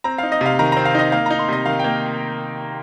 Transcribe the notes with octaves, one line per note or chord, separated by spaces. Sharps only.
C4 A#5
F5
D#4
D#5
C3 F5
D#3 A#5
C4 A#5
F5
D#4 D#5
A#3 F5
A#5
D#4
C6
C3 D#5
D#3 F5
G5
A#3